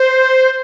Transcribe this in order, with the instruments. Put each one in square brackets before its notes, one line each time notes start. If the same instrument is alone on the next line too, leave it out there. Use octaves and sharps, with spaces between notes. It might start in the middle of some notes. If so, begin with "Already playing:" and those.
Already playing: [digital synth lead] C5